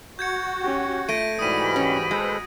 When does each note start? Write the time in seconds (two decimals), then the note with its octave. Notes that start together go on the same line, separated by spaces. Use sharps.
0.19 F#4 G6 G#6 C#7
0.62 C#4 G4
1.09 A3 F4 A#6 D7 D#7
1.39 G#2 E3 G3 F#4 B5 D#6 D#7
1.76 C#4
2.11 G#3 A4 B4 C5